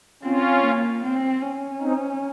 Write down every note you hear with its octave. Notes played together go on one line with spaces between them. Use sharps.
C4 C#4 F4
A#3
C4
C#4
C4 D#4